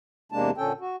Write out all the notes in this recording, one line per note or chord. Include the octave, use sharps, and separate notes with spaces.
E2 C3 G#3 A#3 D4 A5
A#2 D3 C#4 A4 G5
F#4